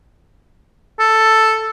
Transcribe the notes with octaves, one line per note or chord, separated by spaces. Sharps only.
A4